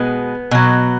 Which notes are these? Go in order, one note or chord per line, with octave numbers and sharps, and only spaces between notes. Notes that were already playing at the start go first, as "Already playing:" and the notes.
Already playing: B2 G#3 B3
B2 F#3